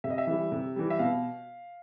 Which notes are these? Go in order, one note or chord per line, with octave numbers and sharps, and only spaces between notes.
C3 E5
D#5
E5
E3 G3
C3
E3 G3
E5
B2 F5